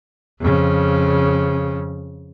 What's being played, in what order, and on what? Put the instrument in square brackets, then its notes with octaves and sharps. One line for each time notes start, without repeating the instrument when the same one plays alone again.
[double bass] F2 C#3